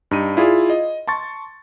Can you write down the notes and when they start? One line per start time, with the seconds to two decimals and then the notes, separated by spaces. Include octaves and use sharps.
0.11 G2 D#4 D#7
0.37 E4 F4 G#4 D5
0.70 D#5
1.07 A5 C6 C#6 A6